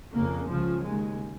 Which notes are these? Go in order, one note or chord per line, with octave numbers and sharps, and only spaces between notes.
F2 C#3 A#3
C#2 C#3 F3
D#2 C#3 G#3